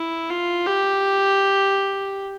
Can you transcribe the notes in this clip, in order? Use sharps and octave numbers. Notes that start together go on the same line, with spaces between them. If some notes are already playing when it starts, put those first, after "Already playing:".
Already playing: E4
F4
G4